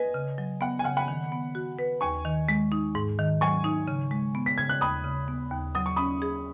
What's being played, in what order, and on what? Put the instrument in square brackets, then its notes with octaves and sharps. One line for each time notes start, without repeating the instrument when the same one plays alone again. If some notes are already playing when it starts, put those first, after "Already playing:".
Already playing: [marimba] B4 [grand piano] D#5 G#5
[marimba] C#3
F#3
[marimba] B3 [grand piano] F#5
[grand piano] G#5
[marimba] C#3 [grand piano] F#5
[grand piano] F#5 B5
[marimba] D#3
B3
F#4
B4
[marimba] D#2 [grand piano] G#5 C#6
[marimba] D#3
G#3
D#4
G#2
D#3
[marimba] F#3 [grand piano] G#5 C#6
[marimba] D#4
C#3
G#3
B3
[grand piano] B6
[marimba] C#3 [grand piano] G#6
[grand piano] F#6
[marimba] D#2 [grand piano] B5 D#6
[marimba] C#3
B3
D#2
[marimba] F#3 [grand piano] D#6
[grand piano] C#6
[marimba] C#4 [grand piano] B5 D#6
[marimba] G#4